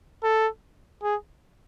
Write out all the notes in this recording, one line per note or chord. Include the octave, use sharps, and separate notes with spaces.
A4
G#4